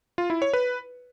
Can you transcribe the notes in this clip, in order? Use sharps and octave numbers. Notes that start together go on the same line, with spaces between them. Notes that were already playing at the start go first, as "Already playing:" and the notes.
F4
E4
C#5
B4